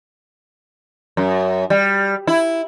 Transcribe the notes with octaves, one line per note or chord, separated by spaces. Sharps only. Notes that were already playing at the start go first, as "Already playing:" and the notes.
F#2
G3
E4